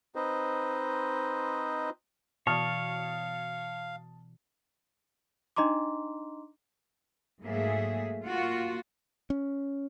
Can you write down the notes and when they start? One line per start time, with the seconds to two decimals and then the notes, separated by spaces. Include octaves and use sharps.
0.15 C4 D#4 B4 C5 D#5
2.47 B2 E3 C#5 D5 F5 A5 D#6 F6
5.56 D4 D#4 D#5 A#5 C6 D6
7.42 G#2 F#3 A3 A#3 G#4 E5
8.22 A#3 F4 F#4
9.30 C#4